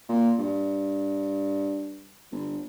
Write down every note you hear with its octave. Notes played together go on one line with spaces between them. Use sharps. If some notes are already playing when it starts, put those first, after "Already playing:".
A#2
G2
G1